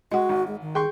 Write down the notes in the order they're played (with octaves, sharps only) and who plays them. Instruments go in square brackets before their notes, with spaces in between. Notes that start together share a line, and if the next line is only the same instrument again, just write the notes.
[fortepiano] G#3 [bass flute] F#4 [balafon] D#5 F#5
[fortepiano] G#1
[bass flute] G#3
D#3
[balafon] G#4 [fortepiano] G5 C6 C#6